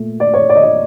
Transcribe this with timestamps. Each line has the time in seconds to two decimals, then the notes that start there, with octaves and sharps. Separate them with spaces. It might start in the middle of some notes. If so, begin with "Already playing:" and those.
Already playing: A#2 A3
0.20 D5
0.34 C#5
0.49 D5
0.55 D#5
0.63 D5